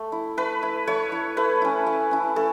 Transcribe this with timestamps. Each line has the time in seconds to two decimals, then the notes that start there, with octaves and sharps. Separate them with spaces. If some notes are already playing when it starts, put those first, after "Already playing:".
Already playing: A3
0.12 E4
0.37 A3 B4
0.63 E4
0.87 A3 C#5
1.12 E4
1.37 A3 B4
1.62 C#4 E4
1.86 A3
2.11 C#4 E4
2.36 A3 A4